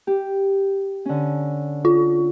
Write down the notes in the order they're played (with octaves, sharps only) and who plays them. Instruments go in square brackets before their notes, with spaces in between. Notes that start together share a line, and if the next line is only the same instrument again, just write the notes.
[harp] G4
D3 C#4
[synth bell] F4